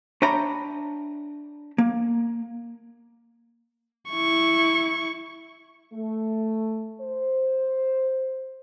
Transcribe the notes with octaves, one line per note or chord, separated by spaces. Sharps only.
D4 C#5 E5 G5 A#5 B5
A#3
E4 C#6
A3
C5